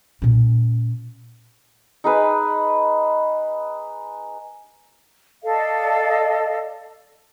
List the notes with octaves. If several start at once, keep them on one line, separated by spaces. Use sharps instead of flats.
A#2 C#4
D#4 G#4 B4
A4 D5 D#5 F5